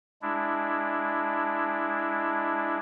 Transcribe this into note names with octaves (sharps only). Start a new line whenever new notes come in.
G#3 D4 E4